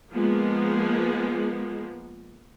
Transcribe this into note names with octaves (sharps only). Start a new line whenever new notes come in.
F3 G#3 A#3 B3